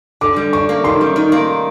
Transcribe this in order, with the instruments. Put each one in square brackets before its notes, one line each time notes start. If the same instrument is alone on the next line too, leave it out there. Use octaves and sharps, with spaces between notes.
[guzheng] D3 [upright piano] D6
[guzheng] G3
[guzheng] D4 [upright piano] C#6
[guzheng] A#3
[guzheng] D#3 [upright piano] C6
[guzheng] G3
D#3
A#3